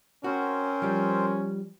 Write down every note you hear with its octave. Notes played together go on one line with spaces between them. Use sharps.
C4 C#4 F#4 A#4 C5
F3 G3